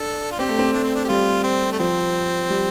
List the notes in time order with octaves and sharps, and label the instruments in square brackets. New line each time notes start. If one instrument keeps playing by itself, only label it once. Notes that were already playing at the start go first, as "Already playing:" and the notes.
Already playing: [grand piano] D4 [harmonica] A4
[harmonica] F4
[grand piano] C4 [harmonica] G4
[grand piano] A3
C4
[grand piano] A3 [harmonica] D4
[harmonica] C4
D4
G4
[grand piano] G3 [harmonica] F4
[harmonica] C4
A3
[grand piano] F3 [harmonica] C4
[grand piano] G3